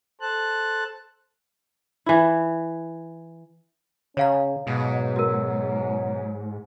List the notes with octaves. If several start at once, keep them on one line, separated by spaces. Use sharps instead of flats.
A4 C5 A5 F#6
E3 E4
C#3 C#4 C#5 F5 A#5
G#2 B2 F#3
F#4 A#4